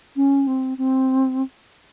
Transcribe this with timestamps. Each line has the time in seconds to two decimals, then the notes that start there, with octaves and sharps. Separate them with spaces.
0.16 C#4
0.47 C4
0.78 C4